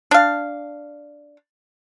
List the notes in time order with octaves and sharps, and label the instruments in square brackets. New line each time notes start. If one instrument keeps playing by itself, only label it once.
[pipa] D4 F5